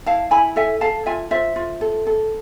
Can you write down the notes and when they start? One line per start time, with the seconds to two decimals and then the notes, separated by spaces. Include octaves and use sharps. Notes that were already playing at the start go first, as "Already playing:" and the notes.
0.06 E4 F5 A5
0.31 E4 G#5 B5
0.56 A4 E5 G#5
0.81 A4 F5 A5
1.06 F4 E5 G#5
1.31 F4 C5 E5
1.56 F4
1.81 A4
2.07 A4